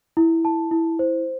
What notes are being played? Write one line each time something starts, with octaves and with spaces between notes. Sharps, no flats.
E4
A5
E4
C5